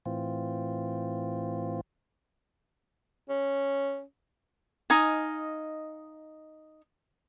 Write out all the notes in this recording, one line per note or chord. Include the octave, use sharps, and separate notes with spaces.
A2 E3 C4 F4
C#4
D#4 D#5 F5 G#5